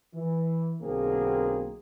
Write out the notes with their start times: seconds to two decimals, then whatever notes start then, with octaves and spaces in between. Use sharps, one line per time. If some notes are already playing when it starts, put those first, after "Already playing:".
0.14 E3
0.82 B1 D3 A#3 C4 G#4 A#4